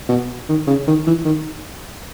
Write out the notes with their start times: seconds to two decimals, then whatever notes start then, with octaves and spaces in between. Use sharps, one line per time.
0.09 B2
0.49 D#3
0.67 C#3
0.87 D#3
1.07 E3
1.25 D#3